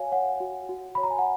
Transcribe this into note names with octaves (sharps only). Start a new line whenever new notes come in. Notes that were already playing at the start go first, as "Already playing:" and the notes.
Already playing: F#4 C#5 F5 G#5
C#5 F#5
F#4
F#4
C#5 B5
A#5
G#5
F#5